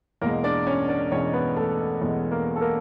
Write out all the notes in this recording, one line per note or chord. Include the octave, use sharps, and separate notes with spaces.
E2 B2 G#3 A#3 A#4
D4 D5
C#4 C#5
D4 D5
E2 B2 G#3 C#4 C#5
B3 B4
A3 A4
E2 B2 G#3
A#3 A#4
A4
A#3 A#4